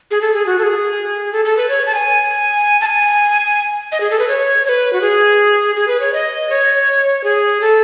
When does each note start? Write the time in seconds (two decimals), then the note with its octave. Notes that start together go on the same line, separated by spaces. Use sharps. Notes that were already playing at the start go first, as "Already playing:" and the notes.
0.11 G#4
0.21 A4
0.34 G#4
0.46 F#4
0.59 A4
0.63 G#4
1.33 A4
1.45 A4
1.57 B4
1.69 C#5
1.86 A5
1.95 G#5
2.81 A5
2.86 G#5
3.92 D#5
4.00 G#4
4.11 A4
4.19 B4
4.28 C#5
4.65 C#5
4.69 B4
4.93 F#4
5.01 G#4
5.76 G#4
5.88 B4
6.00 C#5
6.13 D#5
6.50 C#5
7.24 G#4
7.61 A4